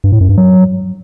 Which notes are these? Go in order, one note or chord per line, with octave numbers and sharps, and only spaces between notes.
G2
A2
F#2
G2
F#3